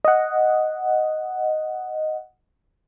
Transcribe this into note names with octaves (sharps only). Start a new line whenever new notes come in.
D#5 F#5